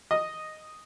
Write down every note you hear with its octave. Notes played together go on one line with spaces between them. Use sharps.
D#5